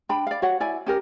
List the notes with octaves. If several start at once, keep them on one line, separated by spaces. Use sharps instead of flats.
D4 G5 B5
D5 F5
F#4 C#5 F#5
E4 D5 G#5
C#4 G4 A#4